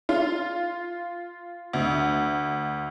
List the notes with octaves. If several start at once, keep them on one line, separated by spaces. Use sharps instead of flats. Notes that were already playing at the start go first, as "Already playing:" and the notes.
F4
D2